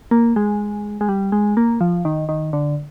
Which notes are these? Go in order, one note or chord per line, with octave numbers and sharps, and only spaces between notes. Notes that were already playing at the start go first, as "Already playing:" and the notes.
A#3
G#3
G#3
G3
G#3
A#3
F3
D#3
D#3
D3